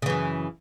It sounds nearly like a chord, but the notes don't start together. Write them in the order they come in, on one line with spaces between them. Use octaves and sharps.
C#3 E3 F#2